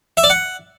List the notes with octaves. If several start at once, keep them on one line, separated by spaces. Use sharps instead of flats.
E5
D5
F#5